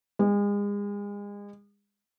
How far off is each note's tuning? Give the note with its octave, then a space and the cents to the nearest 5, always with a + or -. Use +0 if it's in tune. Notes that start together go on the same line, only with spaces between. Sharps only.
G#3 -35